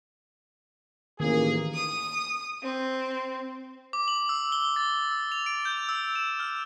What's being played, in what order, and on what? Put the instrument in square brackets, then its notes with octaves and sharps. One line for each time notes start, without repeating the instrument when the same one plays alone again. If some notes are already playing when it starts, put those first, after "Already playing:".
[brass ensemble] A1 A#3 G#4 [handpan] D#3
[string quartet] D#6
C4
[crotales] D6
F#7
E6
G7
A6
E6
F7
D7
G6
E6
E7
F6